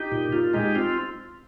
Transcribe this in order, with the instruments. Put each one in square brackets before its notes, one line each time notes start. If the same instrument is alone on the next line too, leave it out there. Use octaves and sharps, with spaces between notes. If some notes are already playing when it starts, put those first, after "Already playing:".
Already playing: [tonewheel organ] D#4 G4
A#2
A#2 F4
G#3 D#4 G4
C4 F4